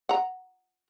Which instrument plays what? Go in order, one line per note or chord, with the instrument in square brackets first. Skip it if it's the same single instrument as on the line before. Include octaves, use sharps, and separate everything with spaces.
[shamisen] F#5 A#5